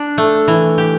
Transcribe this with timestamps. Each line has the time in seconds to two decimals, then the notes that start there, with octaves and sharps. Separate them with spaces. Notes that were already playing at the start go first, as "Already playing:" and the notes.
Already playing: D4
0.18 A3
0.48 E3
0.78 G4